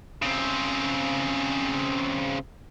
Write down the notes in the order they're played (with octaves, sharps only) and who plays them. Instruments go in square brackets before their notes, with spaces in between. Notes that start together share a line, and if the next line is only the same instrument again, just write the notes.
[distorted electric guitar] C#3 C4